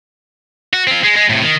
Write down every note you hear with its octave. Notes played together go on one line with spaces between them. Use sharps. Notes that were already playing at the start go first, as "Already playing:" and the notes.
F#4
C4 F4
G#3
G#3
A2 C3
D#3